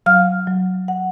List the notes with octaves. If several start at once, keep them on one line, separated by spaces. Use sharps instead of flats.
F#3 F5 F6
F#3
F#5